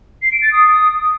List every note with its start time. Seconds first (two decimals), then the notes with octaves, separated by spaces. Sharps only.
0.22 C7
0.31 D7
0.41 A6
0.51 D#6